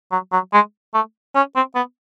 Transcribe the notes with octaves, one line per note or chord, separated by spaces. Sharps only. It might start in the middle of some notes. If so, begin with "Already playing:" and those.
F#3
F#3
G#3
A3
C#4
C4
B3